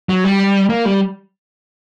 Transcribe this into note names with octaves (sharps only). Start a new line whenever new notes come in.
F#3
G3
A#3
G3